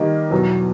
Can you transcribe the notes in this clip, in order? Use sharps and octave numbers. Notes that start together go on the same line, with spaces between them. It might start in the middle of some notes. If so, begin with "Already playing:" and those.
Already playing: D#3 G3 A#3 D#4 G4
E2 B2 F#3